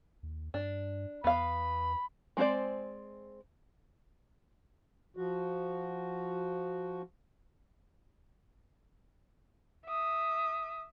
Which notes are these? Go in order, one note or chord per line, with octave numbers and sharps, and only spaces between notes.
D#2
G2 D4
E2 B3 F5 B5
G#3 C4 F#4 C5 D5
F3 F#4
E5 D#6